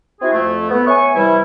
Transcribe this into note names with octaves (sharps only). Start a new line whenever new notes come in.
C4 E4 F#4 G#4
F2 A3
B3
C#5 E5 G#5 C#6
C3 E3 G3 E4